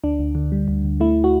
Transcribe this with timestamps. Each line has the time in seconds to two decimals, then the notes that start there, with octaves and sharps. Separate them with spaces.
0.03 D2 D4
0.19 D2
0.35 D3
0.52 G3
0.68 D2
0.85 D2
1.00 A3 E4
1.24 F#4